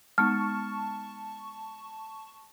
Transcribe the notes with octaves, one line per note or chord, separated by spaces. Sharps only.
G#3 B3 D#4 A5 C#6 F6